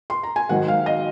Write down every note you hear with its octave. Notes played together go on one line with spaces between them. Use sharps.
C6
A#5
G#5
G#2 D#3 F#3 F#5
F5
D#5